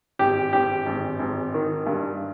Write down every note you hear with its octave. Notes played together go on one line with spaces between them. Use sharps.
G#1 G4
G#1 G4
G#1
G#1
D#3
G2